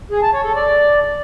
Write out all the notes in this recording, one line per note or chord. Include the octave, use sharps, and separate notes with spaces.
G#4
A5
C#5
A4
D5